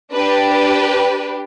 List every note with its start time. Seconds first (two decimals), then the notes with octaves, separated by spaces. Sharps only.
0.14 D4 G4 B4
0.51 B4